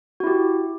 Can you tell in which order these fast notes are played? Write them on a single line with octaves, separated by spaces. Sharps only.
F#4 E4 G4